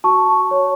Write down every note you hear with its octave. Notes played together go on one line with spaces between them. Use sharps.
F#4 A5 C#6
C#5